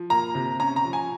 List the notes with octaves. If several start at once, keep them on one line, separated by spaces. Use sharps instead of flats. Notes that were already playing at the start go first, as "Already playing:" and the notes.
Already playing: F3
A#3 A#5
C3
C#4 A#5
A#5
F3
G#5